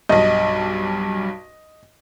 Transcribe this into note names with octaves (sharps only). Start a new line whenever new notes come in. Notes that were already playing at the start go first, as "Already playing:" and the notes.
B1 G2 D#5